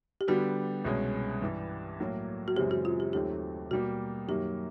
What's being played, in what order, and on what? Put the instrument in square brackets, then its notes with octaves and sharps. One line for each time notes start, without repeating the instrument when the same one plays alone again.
[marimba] G4
[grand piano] D3 G3 B3 [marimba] F#4
[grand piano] C2 B2 G#3 C#4
G2 E3 G3
A2 F#3 A#3
[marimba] F#4
[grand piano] F#2 C#3 E3 G#3 C4 [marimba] G4
[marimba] F#4
F4
G4
[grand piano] D#2 D#3 F#3 A3 C4 [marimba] G4
[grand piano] B2 G3 A#3 [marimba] F#4
[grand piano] F#2 D#3 F#3 A#3 [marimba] G4